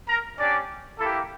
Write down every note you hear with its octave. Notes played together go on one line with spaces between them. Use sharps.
A#4 A#5
C#4 D4 G4 D5
A#3 E4 G4 A4